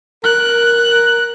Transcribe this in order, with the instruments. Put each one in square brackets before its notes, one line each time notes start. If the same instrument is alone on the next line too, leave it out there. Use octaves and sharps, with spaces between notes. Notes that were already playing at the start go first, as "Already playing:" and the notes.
[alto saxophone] A#4 [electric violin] F#6